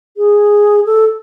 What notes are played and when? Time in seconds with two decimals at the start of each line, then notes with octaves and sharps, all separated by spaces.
0.17 G#4
0.86 A4